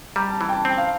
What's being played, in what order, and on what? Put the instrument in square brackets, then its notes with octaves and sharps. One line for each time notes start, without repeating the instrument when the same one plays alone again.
[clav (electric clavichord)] G3 [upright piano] A#5
[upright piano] A5
[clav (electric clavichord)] E3 [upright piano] A5
[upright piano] G5
A5
[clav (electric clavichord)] C4 [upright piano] G5
[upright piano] F5